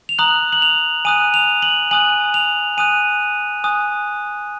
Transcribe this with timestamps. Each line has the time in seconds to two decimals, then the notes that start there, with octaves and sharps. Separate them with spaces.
0.09 F7
0.19 A#5 D#6 F#6 F#7
0.53 F#7
0.62 F7
1.05 G#5 D#6 F#6 D#7
1.34 F7
1.62 F#7
1.91 G#5 D#6 F#6 F#7
2.34 F7
2.77 G#5 D#6 F#6 D#7
3.64 G#5 D#6 F#6